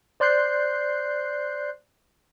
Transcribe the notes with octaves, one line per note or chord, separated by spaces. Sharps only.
C5 D5 C6 F#6 G6 C7